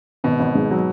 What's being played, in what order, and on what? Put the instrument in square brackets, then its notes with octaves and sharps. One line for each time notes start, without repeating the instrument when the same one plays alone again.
[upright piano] G#1 [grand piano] B2
[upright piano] G#1
G#2
F#3